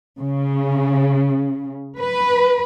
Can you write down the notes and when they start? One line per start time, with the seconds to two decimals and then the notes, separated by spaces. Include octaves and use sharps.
0.19 C#3
1.99 B4